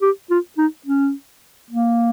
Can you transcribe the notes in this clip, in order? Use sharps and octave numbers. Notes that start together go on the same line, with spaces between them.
G4
F4
D#4
C#4
A#3